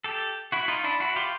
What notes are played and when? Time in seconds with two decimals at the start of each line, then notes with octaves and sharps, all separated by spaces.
0.04 G4 A4
0.52 E4 F#4
0.68 D#4 F4
0.84 D4 E4
1.00 E4 F#4
1.16 F4 G4